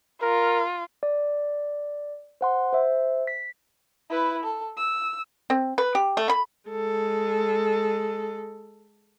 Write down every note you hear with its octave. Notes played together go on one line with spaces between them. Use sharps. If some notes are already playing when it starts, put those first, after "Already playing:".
F4 A#4
D5
C5 F#5 C6
C5 E5
B6
E4 B4
A4
E6
C4
B4
G4
A3
B5
G#3 A4